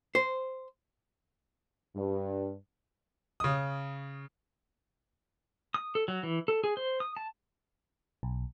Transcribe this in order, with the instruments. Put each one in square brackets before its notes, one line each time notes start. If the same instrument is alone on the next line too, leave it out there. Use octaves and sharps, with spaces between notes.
[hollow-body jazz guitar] C5
[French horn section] G2
[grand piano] C#3 D#6
[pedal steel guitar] D#6
A4
F#3
E3
A4
G#4
C5
D#6
A5
[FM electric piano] B1